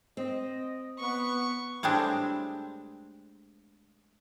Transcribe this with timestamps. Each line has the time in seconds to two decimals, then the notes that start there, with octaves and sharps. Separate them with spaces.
0.17 C4 D#5
1.00 B3 B4 C#6
1.83 A2 G3 G#3 C4 D4